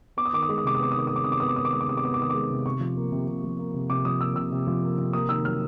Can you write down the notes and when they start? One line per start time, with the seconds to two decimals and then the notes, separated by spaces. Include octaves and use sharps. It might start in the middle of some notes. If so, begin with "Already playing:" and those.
0.17 B3 D6
0.26 D#6
0.33 D#3 D6
0.43 D#6
0.49 G#3 D6
0.58 D#6
0.64 C3 D6
0.75 D#6
0.79 B3 D6
0.92 D#6
0.95 D#3 D6
1.07 G#3 D#6
1.16 D6
1.24 C3 D#6
1.32 D6
1.40 B3 D#6
1.48 D6
1.56 D#3 D#6
1.65 D6
1.72 G#3 D#6
1.81 D6
1.88 C3 D#6
1.97 D6
2.03 B3 D#6
2.14 D6
2.20 D#3 D#6
2.30 G#3 D6
2.51 C3
2.66 C3 C#6
2.81 F3
2.97 A#3
3.12 C3
3.28 C3
3.44 F3
3.59 A#3
3.74 C3
3.90 C3 D6
4.05 F3 D#6
4.21 A#3 E6
4.36 C3 E6
4.52 C3
4.67 F3
4.83 A#3
4.98 C3
5.13 A#3 D#6
5.29 D#3 E6
5.45 F#3 F6